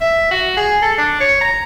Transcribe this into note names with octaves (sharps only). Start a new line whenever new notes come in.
E5
F#4
G#4
A4
D4
C#5
A#5